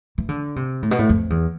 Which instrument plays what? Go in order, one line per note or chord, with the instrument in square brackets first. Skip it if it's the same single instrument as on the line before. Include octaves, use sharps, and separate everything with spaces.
[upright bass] E3
D3
C3
A2
B2
A2
F2
E2